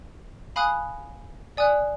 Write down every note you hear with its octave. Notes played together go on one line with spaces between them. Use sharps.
F5 G#5 B5 D#6 F#6
D5 G#5 D#6 F#6